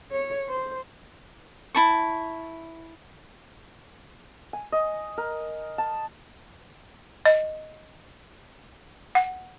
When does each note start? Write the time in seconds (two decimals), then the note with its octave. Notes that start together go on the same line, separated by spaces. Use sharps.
0.11 C#5
0.49 C5
1.75 E4 A5 C#6
4.53 G#5
4.72 D#5
5.17 A#4
5.78 A5
7.26 D#5
9.15 F#5